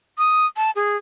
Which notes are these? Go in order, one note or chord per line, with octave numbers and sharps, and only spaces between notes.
D#6
A5
G#4